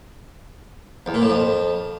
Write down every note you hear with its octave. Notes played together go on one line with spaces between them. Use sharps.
E2
A#2
A2
F2